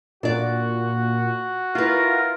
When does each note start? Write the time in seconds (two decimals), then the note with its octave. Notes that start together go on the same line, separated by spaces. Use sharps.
0.23 A#2 D4 F#4 D5
1.75 E4 F4 A#4 B4